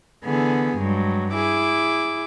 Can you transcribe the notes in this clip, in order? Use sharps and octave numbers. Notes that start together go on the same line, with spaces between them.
D3 E3 B3 G#4
G2 F#3 G#3
E4 G#4 D6